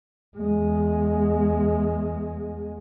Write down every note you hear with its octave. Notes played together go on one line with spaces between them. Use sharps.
E2 G#3